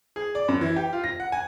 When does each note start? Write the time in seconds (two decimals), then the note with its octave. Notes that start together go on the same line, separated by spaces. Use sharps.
0.16 G#4
0.35 D5
0.48 F#2
0.61 E3
0.76 G4
0.93 F4
1.04 A#6
1.20 F#5
1.32 G#5